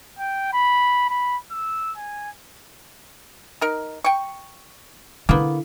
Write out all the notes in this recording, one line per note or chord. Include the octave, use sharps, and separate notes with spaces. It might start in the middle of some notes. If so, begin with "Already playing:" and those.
G5
B5
B5
E6
G#5
D#4 A#4
G5 C#6
D3 A#3 B3 E4